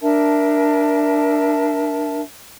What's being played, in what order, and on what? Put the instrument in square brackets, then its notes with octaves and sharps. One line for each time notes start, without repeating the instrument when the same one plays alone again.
[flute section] D4 A#4 E5 A5